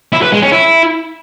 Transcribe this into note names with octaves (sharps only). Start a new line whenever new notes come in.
E4
B4
G#3
C#4
E4